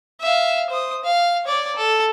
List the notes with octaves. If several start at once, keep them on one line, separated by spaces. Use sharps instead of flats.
E5 F5
C5 D#6
F5
C#5 D5
A4